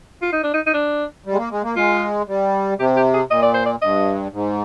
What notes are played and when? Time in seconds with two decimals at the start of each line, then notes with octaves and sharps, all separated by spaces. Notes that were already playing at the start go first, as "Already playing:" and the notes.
0.22 F4
0.32 D#4
0.43 D4
0.54 D#4
0.66 D#4
0.74 D4
1.26 G3
1.32 G#3
1.37 A#3
1.51 G#3
1.63 A#3
1.76 G#3 F4
2.28 G3
2.78 C3 G4
2.96 G4
3.14 G#4
3.30 A#2 D#5
3.42 D5
3.54 C5
3.66 D5
3.82 G2 D#5
4.33 G#2